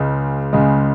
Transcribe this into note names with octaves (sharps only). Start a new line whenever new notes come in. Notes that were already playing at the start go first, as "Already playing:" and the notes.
Already playing: C#2 C#3 G#3
C#2 C#3 G#3